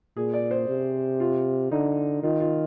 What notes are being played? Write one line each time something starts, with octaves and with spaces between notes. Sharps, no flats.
A#2 G#4
D5
C5
C3
F4
D3 D#4
D#3 F4
F4